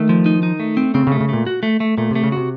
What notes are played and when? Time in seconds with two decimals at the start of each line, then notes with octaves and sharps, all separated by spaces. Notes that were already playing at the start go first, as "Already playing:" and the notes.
Already playing: D#3 A3
0.09 F3
0.26 D#4
0.43 D#4
0.60 A3
0.77 C4
0.94 C#3 C4
1.07 C#3
1.12 A3
1.20 C#3
1.29 A#2 A3
1.47 F#4
1.63 A3
1.80 A3
1.98 A#2 A3
2.11 C3 A3
2.24 C#3
2.32 C3 F#4